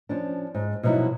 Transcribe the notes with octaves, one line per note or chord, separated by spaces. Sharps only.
F3 C#4 D4
G#2
B2 F3 F#3 D#4 E4